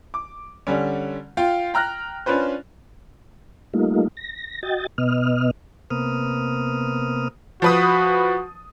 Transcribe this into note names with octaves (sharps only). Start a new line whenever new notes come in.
D6
D3 G3 C#4
F4 F5 G5
G5 A#5 F6 F#6 A#6
C#4 D4 F4 B4 C5
G3 A3 A#3 D#4 F4
A#6
F#4 D#5 G5 A6
B2 B3 D#5 F6
C3 A#3 B3 D#6 F6
F3 F#4 B4 D#6